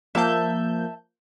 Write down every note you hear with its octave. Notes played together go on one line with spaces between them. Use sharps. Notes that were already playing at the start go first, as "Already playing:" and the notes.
F3 A#3 E5 A5 G6